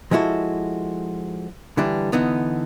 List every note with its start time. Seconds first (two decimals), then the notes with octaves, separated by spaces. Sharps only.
0.11 F3 G#3 E4 F#4 A4
1.77 D3 E3 G3 D4
2.12 D3 E3 B3 D#4